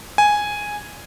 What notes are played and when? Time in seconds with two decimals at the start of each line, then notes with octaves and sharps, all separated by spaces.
0.18 G#5